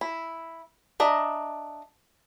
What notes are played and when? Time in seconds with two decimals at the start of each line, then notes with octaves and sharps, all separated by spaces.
0.01 E4
1.00 D4 D#5 E5 A#5